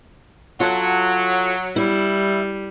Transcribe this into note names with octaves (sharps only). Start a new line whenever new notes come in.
F#3 F4 A4 F#5
G3 E4